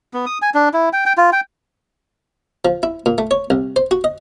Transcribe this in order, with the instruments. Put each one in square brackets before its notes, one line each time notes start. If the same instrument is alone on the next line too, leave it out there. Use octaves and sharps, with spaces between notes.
[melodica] B3
D#6
G#5
D4
E4
G5
G5
F4
G5
[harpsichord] F3
E4
A#2
A3
C#5
C2
C5
F#4
D#5